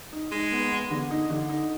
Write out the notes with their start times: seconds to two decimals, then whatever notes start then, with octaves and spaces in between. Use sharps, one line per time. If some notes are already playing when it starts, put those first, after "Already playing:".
0.13 D#4
0.32 G#3 D#4
0.52 B3
0.71 B3
0.91 D3
1.10 D#4
1.30 D3
1.49 D#4